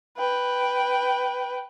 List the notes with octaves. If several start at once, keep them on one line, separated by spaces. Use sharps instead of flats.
B4 G5